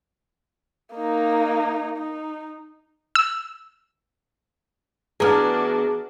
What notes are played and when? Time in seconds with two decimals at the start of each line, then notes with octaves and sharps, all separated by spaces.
0.95 A#3 D#4
1.98 D#4
3.15 E6
5.20 E3 B3 D4 F#4 G#4 A#5 D#6 F6